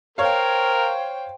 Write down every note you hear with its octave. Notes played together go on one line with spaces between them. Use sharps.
A#4 C5 C#5 F5 G5